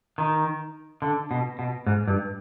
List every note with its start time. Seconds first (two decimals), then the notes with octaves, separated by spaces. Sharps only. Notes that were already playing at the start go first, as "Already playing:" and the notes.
0.18 D#3
1.02 D3
1.31 B2
1.59 B2
1.86 G#2
2.08 G2